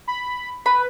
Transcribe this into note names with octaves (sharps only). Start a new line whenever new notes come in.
B5
B4 B5